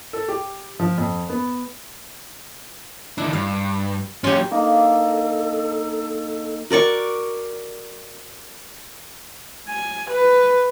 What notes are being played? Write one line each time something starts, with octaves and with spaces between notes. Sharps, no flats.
A4
G4
F3
F2
B3
D#3 D4 E4
G2 F5
A#2 F#3 C#4 F4 G4
A#3 D4 D#4 A4
F#4 A#4 D5 C#6
G#5
B4